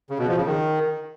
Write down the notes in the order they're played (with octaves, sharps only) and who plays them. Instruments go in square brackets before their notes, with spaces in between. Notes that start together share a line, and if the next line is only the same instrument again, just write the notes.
[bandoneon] C#3
B2
F3
C#3
D#3